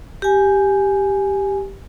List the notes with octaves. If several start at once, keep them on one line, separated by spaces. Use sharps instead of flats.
G4 G#5